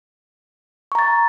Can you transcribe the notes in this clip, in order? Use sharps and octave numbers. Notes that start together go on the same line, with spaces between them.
A#5 C#6 A6